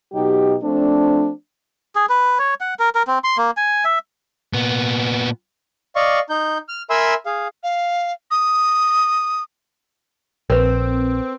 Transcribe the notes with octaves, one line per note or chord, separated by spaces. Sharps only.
B2 F#3 D#4 G4
F3 A3 C4 D4
G#4
B4
C#5
F#5
A#4
A#4
C4
C6
A#3
G#5
E5
A#2 B3
D5 D#5 F5 C#6
D#4 G6
F6
A#4 E5 G#5 B5 C6 E6
G#4 F5
F5
D#6
A#1 C4 A#4 B4